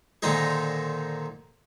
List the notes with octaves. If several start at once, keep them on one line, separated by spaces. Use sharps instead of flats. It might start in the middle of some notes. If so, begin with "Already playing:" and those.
A#2 D3 D#3 C4 D#4 G#4